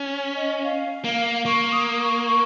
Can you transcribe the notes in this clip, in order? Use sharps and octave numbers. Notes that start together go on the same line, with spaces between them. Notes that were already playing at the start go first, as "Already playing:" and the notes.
Already playing: C#4
D#5
F5
A#3
A#3 C#6
D#6
C#6
C#6